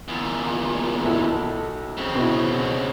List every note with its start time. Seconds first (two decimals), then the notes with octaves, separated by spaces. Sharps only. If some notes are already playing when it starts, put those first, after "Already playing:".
0.08 E2 A#2
1.04 B1 E4 A4
1.98 C#3 C4
2.15 B2 E4